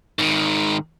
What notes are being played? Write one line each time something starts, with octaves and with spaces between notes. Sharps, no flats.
G#2 D#3